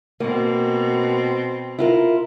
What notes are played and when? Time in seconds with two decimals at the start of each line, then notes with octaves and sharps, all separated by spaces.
0.20 B2 A#3 C4
1.79 E4 F4 A#4